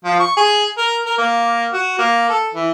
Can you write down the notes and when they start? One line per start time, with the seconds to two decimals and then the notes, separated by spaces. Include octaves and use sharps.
0.05 F3
0.20 C#6
0.37 G#4
0.78 A#4
1.06 A#4
1.18 A#3
1.73 F#4
1.99 A#3
2.29 A4
2.54 E3